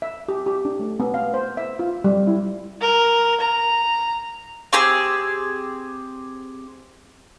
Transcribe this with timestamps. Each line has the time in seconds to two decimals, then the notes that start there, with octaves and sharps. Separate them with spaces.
0.02 E5
0.28 G4
0.46 G4
0.65 D4
0.79 A3
1.00 B3
1.14 F5
1.34 C5
1.57 E5
1.79 F4
2.04 G3
2.27 E4
2.81 A#4
3.40 A#5
4.73 C4 G4 G#4 E6